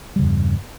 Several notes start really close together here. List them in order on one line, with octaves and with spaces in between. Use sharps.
G3 C#3 E2 G2